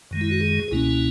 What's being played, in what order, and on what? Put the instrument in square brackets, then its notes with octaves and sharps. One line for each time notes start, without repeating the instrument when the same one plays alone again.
[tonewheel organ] F#2 D#3 G#3
E4
F#4
G#4
C#2 B2 A#3 C#4 E4